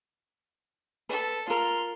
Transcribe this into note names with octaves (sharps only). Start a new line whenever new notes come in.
A4 B4
F4 A#4 C6 F6